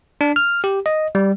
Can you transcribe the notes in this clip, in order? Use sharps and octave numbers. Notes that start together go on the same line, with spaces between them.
D4
F6
G4
D#5
G3